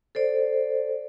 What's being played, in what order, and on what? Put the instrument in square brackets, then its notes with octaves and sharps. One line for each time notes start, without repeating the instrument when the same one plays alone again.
[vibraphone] A4 C5 D5